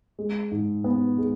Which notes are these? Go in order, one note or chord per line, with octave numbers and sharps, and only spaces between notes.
G#3
G#2
B3
G#3